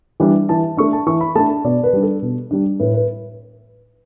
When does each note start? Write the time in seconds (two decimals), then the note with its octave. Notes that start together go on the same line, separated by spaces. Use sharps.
0.20 E3 G3 D4
0.49 E3 A5
0.77 A3 D4 C#6
0.93 A5
1.07 E3 C#6
1.21 B5
1.35 A3 D4 A5
1.64 B2 D5
1.83 B4
1.93 G3 D4
2.03 A4
2.22 B2
2.51 G3 D4
2.80 A2 B4
2.94 B4